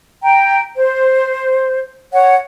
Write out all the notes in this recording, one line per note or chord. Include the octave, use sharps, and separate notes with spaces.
G5 A#5
C5
C#5 F#5